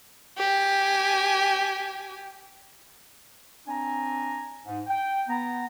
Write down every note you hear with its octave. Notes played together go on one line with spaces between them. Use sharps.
G4 G#5
C4 D4 G#5 A#5
G#2
G5
B3 A#5